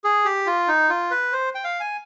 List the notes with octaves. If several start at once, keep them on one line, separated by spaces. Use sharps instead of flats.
G#4
G4
F4
D#4
F4
B4
C5
G5
F5
G#5